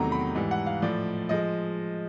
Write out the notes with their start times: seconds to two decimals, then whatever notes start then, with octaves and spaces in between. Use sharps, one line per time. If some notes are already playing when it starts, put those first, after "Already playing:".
Already playing: E2 C3 D#3 F#3 A3 A#5
0.12 B5
0.35 G#2 E3 G3
0.51 F#5
0.66 F5
0.82 A2 F3 A3 D5
1.29 F3 G#3 D#5